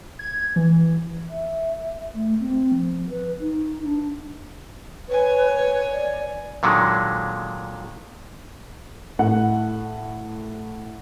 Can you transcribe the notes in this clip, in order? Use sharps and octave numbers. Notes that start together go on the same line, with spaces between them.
G#6
E3
E5
A3
C4
F3
B4
D#4
D4
B4 C#5 G#5
B4
D5
A#2 D3 D#3 F#3 G#3
A2 F#5